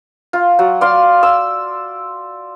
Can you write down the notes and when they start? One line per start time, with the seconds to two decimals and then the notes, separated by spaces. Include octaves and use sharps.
0.33 F4
0.59 F#3
0.81 D5 F5 C6
1.23 E6